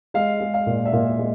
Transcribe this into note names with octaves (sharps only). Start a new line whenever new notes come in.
G#3 F5
G#3
F5
A#2
E5
A#2 F5
G#3